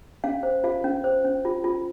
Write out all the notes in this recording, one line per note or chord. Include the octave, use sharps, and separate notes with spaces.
C#4 F5
C5
F4 F5
C#4
C5
C#4
F4
F4